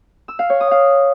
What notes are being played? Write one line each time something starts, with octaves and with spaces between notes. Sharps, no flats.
E6
F5
C#5
D#6
F5